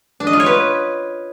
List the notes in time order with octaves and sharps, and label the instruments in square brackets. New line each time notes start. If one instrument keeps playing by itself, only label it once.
[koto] D4
D#5
F4
C#5
B4